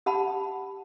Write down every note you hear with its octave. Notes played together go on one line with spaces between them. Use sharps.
G4 F#5 A5 B5